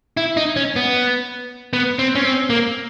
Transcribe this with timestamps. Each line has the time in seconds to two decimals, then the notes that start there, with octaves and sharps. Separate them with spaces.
0.17 E4
0.37 D#4
0.56 C#4
0.76 B3
1.73 B3
1.99 C4
2.15 C#4
2.25 C4
2.50 A#3